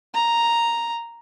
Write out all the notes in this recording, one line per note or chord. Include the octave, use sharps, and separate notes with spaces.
A#5